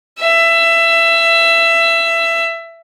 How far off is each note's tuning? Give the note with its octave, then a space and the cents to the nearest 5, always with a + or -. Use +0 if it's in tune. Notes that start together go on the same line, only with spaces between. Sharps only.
E5 +20